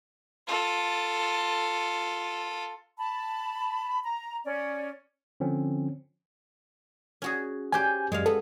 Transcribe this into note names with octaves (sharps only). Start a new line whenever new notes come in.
F4 A4
A5 B5
A#5
C#4 D5
D3 F3 C4 C#4
C#4 F#4 G#4
C#4 G4 C5 G#5 G6
F#2 G#3 C#5 F5
B3 A4